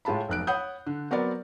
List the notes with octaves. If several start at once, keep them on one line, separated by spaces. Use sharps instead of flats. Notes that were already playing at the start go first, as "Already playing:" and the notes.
A2 G#3 F4 A5 B5
F1 B1 F#6 D7
C#5 F#5 B5 D#6 G6
D3
F#3 B3 C4 A#4 D5